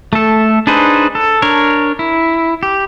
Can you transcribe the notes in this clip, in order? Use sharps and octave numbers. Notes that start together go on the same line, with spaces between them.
A3 A4
D4 D#4 G#4 B4 C5
A4
D4 A#4 C#5
E4
G4